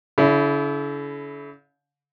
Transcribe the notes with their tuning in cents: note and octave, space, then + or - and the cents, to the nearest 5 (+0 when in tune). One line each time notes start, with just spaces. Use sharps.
D3 -45 E4 +0